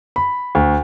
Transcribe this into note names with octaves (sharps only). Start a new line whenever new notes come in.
B5
D2